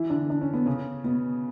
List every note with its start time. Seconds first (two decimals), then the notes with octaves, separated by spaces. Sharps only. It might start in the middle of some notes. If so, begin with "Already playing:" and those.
Already playing: E3 E4
0.10 D3 D4
0.30 D4
0.41 C#4
0.53 B3
0.66 C#3 C#4
1.04 B2 B3